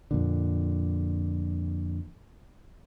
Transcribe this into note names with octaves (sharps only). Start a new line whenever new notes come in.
F2 A#2 D3